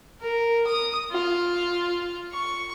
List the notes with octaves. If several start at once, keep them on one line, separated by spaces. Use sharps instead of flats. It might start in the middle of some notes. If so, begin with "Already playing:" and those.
A#4
D#6
F4
C#6